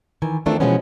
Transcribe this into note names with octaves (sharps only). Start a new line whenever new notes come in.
D#3 E3 G#5
D#3 E3 A3 C4 D4 F4
B2 E3 F3 G#3 B3 C#4